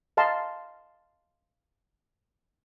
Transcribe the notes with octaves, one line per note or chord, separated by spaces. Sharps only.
D#5 F5 A5 A#5 C6